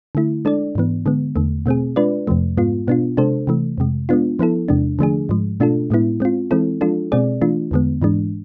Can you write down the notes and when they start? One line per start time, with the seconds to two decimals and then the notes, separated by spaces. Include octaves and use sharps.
0.15 D3 A3 E4
0.45 G#3 D4 A4 D5
0.75 G#2 E3 B3
1.06 D3 G#3 B3
1.36 E2 D3 A3
1.66 B2 A3 C4 G#4
1.96 G#3 D4 F4 B4 D5
2.27 F2 C3 F3 A3
2.57 G#2 G#3 B3 F4
2.87 B2 B3 D4 F4
3.17 C3 G#3 D4 A4 C5
3.47 C3 E3 A3
3.78 F2 C3 G#3
4.09 G#3 B3 D4 F4
4.39 F3 B3 E4 A4
4.68 E2 C3 G#3 D4
4.99 D3 F3 A3 D4 G#4
5.29 G#2 F3 G#3
5.60 B2 A3 D4 F4 A4
5.90 A2 G#3 B3 E4
6.20 G#3 C4 F4
6.51 E3 G#3 C4 E4 A4
6.81 F3 G#3 D4 F4 A4
7.12 B2 G#3 C4 G#4 D5
7.41 E3 A3 D4 F4
7.71 E2 D3 G#3 B3
8.02 G#2 E3 G#3 D4